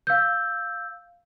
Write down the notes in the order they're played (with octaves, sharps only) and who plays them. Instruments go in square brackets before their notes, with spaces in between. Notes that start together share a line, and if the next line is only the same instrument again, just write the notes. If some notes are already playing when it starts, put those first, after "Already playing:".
[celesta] F5 E6 G6